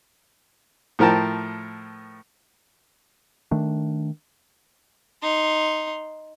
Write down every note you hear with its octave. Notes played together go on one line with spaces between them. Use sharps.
A2 F3 A#4 G5 A5
D#3 A3 D4
D#4 C6